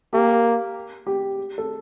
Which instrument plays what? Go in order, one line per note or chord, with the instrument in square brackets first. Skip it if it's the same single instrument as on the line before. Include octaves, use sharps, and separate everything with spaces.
[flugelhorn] A#3 [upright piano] G4
[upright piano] G4
A4